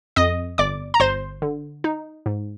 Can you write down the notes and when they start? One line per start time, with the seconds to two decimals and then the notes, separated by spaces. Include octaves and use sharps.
0.16 F2 D#5 D#6
0.58 G1 D5 D6
0.94 A#5
1.00 G1 C5 C6
1.42 D3
1.84 D#4
2.26 G#2